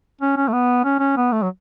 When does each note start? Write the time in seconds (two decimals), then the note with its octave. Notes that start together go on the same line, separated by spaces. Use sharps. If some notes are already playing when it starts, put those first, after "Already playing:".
0.21 C#4
0.36 C#4
0.48 A3
0.52 B3
0.84 C#4
1.00 C#4
1.17 B3
1.32 A3
1.42 F#3